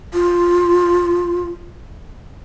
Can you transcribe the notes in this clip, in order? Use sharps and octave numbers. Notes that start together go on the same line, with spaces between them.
F4